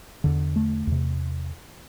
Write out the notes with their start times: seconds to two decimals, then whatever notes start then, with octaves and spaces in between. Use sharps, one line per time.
0.24 E2 D3
0.56 A3
0.87 E2 C3